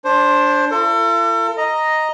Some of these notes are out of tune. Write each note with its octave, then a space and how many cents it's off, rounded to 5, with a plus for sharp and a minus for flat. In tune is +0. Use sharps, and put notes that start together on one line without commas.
D4 -10 C5 +15
F4 -45 A4 +40
D#5 +0 A#5 +0